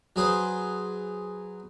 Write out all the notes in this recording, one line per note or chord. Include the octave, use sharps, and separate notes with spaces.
F#3 G#4 B4 C5